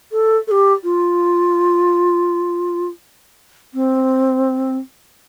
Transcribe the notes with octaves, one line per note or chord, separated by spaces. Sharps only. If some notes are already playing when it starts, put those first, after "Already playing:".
A4
A4
G4
F4
C4